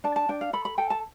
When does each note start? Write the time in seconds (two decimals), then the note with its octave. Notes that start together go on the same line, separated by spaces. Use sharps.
0.04 D4 A5
0.16 A5
0.29 D4 G5
0.41 F5
0.53 A4 B5
0.65 B5
0.78 A4 G5
0.90 A5